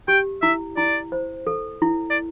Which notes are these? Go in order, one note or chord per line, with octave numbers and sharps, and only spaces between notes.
G4 G5
E4 E5
E4 D5
C5
A4
E4
D5